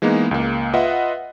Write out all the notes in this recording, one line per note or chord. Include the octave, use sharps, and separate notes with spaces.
E3 G#3 A#3 B3 D#4 E4
C#2 A#3
F4 B4 D#5 E5 F#5